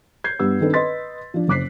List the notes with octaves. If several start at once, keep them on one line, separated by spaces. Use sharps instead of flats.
G6 G#6 C7
G2 G3 B3 E6
D#3 C4 D4 A4 B4
B4 D#5 C6 A6 B6
F3 D4
F#1 C5 D6 F#6 B6 C7